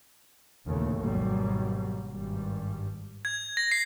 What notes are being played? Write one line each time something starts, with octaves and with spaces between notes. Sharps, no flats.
A#1 D#2 C#3 A3
G#1 D#2 G#2 B2 F#3 G3
G#1 G2 G3
G#6
A#6
C7